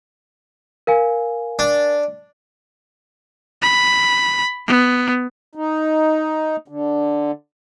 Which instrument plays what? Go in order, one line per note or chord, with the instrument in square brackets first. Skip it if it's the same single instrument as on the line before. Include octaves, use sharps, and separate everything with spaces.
[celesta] A#4 F5 G#5
[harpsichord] D4
[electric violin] B5
B3
[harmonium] D#4
D3